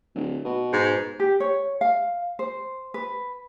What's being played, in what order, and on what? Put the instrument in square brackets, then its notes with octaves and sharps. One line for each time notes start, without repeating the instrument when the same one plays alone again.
[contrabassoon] D1
B2
[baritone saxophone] G#2
[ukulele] G4
C#5
F5
C5
B4